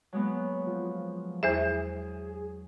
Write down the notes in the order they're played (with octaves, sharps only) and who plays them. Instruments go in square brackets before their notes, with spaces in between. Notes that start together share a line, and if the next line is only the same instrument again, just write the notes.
[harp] F#3 G#3 B3
[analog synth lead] F3
[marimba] E2 C5 E5 [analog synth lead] G#4